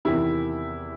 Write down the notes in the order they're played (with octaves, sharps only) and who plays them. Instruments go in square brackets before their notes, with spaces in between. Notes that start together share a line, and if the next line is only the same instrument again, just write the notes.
[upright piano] E2 C3 D#3 E4